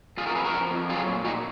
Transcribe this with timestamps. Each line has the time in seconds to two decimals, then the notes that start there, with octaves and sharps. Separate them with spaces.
0.17 F2 F4 G#4
0.26 F#4 A#4
0.35 F2 G#4 B4
0.45 F#4 A#4
0.54 F3
0.71 F2
0.89 F#3 F4 G#4
1.07 A#2
1.25 A#2 D#4 F#4